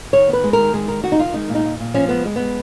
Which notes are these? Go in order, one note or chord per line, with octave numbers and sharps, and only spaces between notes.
D#3 C#5
B3
B4
G#3
A#4
D#3
G#3 G#4
D#3 A#4
D#3 F#4
D#4
D#3 F4
G#3 D#4
A#2
D#4
A#2
A#2
F3 C#4
G#3 B3
G#3
G#3 B3